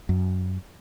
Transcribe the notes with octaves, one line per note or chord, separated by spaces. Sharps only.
F#2